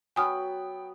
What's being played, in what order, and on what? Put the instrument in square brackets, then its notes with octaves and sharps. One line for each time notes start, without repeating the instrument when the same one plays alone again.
[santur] F#3 B3 B5 [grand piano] G5 [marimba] G#5 D#6 F6